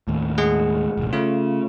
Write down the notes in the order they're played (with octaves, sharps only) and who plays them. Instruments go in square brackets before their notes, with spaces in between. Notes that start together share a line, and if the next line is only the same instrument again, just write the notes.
[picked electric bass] D#2 A2
[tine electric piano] G#3 G#4 F#5
[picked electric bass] E1 A1
[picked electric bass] C#3 [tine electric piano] A3 F4